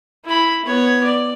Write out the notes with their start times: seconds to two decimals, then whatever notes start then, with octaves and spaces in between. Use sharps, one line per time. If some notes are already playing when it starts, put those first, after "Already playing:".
0.25 E4 B5
0.65 B3 C#5
1.04 D5